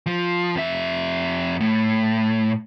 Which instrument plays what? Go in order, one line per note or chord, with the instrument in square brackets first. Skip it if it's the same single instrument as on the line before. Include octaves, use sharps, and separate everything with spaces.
[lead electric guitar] F3
F2 E5
A2